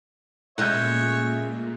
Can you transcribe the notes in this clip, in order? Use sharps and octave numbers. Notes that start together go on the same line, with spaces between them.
A#2 C#3 G#3 A3 C#5 E5 F#6 G6